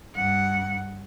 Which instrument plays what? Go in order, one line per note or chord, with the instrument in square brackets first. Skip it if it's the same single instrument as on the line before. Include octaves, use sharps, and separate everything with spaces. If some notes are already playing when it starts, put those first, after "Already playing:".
[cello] G2 F#5